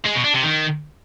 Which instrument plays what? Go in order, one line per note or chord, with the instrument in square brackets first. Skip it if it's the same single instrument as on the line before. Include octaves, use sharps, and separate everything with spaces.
[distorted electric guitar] G#3
B2
D4
C3
D#3